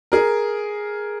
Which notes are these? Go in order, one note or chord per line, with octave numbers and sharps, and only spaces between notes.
G#4 A#4